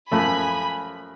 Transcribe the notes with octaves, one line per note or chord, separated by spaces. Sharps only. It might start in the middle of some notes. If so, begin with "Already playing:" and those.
F#2 F3 A3 G#5 B5